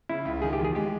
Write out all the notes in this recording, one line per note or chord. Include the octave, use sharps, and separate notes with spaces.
C#3 E4
C#2
D#3 G#4
G4
E2
G#4
G#3 G4